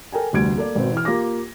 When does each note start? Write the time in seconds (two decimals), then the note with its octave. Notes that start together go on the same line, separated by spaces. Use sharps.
0.12 A4 A#4 G5 G#5
0.33 F1 D2 G3 G#6 D7
0.56 A#3 A4 D5
0.75 G#1 B2 C4
0.92 E3 F6
1.05 A#3 F4 G4 D6 A#6